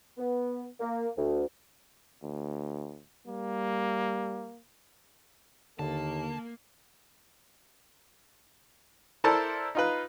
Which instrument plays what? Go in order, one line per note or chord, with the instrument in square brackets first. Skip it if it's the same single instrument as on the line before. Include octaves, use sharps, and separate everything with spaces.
[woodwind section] B3
A#3
D2
[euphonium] D2
[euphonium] G3 [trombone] A#3
[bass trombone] D#2 [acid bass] D3 [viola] A#3 [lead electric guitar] A5
[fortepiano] E4 A4 A#4 C5 D5 A5
D#4 F4 B4